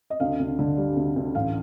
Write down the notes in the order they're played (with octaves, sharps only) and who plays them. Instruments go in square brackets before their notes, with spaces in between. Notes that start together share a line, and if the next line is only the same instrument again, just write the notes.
[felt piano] D#5
D2 F5
D2
D3
G3
D2
D2
A1 F5